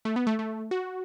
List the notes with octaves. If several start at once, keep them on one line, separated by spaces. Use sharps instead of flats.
A3
B3
A3
A3
F#4